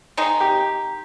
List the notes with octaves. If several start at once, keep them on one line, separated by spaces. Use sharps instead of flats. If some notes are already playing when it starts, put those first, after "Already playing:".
D#3 G#3 D#4
G4